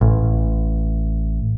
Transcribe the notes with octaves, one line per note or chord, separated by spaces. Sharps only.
A1